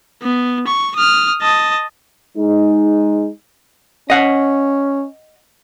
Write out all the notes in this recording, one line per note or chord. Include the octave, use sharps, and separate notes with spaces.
B3
C#6
D#6 F6
D#5 A5
G#3 D#4
C#4 D#5 F#5